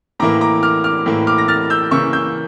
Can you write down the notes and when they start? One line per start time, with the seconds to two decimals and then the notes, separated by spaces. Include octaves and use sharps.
0.20 A2 E3 A#3 A#5 D6
0.41 A#5 D6
0.63 D6 F6
0.84 D6 F6
1.06 A2 E3 A#3
1.27 D6 F6
1.38 A#6
1.48 F6 A6
1.70 E6 G6
1.91 C#3 E3 A#3 C#6 E6
2.13 E6 G6